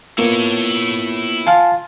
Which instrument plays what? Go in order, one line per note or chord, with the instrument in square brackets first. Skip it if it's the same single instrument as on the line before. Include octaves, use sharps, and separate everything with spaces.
[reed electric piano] A#3 B3 F4 [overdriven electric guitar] E4 C#5
[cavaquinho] F4 [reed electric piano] G#5 A5 F6